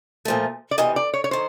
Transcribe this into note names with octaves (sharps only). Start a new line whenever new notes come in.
A#2 F3 A3
D5
E2 C3 E3 D#5
D5
C#5
C#5
D#3 C5